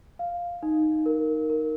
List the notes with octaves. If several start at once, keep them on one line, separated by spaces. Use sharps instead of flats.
F5
D#4
A#4
A#4